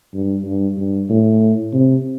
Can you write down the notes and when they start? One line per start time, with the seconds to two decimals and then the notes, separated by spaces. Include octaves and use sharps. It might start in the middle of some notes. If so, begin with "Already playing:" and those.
0.14 G2
0.45 G2
0.78 G2
1.10 A2
1.74 C3